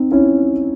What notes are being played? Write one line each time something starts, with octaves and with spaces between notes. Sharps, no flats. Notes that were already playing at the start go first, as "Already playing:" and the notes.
Already playing: C4 D#4
C#4 E4